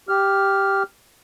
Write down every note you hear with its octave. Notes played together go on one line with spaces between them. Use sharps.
G4 F6